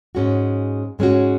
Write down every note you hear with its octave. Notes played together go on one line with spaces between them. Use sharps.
G#2 G#3 C#4 F#4
G#2 G#3 C#4 F#4